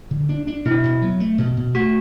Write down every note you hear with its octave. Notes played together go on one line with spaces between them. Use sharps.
D3
D4
D4
B2 E4
B2
F#3
A3
B2
B2
A3 F#4